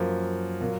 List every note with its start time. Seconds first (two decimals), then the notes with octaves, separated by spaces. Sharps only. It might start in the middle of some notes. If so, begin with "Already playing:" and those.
Already playing: F#2 F3 A#3
0.61 A#2 F#3 A#3